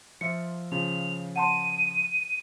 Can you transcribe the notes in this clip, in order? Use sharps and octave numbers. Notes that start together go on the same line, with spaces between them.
F3 F4 E5 C#7
C#3 F3 F7
F#5 A5 C6 D#7